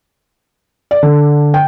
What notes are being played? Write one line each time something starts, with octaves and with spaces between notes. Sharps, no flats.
D5
D3
G5